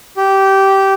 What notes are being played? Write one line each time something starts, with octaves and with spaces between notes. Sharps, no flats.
G4